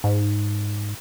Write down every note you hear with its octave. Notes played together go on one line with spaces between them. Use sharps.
G#2